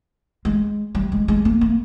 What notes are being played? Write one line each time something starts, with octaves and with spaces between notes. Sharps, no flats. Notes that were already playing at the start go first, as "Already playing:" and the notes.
G#3
G3
G#3
G#3
A#3
A#3